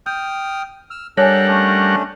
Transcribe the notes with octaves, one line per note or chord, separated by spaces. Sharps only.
G5 D#6 F6 G6
E6 F6
G3 D4 A4 A#4 C#5 F#5 G#5 F#6
A3 C#4 D4